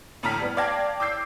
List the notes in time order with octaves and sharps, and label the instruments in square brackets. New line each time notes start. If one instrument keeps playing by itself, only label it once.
[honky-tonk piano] D2 A2 A5 A#5 F6 B6
G3 B3
D5 F5 G5 A5 G#6 A#6
D6 E6 G6 C7